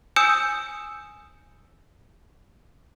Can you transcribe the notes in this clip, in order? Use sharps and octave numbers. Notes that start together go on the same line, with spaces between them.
G#5 D#6 E6 G6 C#7 E7